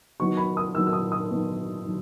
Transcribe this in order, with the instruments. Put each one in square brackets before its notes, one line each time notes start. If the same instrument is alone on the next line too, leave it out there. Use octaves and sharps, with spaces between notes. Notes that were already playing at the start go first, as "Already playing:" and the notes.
[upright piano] D#3 F#3 B3 D#4 C#6
B5
D#6
D#3 F#3 B3 D#4 E6
E6
D#6
D#6
D#3 F#3 B3 D#4
D#3 F#3